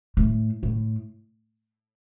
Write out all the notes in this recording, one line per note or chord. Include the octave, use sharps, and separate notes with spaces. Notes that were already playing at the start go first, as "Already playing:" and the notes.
A2
A2